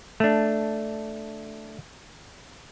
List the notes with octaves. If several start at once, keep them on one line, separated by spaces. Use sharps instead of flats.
A3 D4